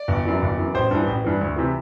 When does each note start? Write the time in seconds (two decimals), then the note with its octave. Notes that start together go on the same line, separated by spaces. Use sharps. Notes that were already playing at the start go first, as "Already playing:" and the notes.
Already playing: D5
0.08 G1
0.25 F#2 E3
0.42 G1
0.58 F#2 E3
0.75 A1 C5
0.91 G2 E3
1.07 A1
1.24 G2 E3
1.41 D2
1.56 C3 E3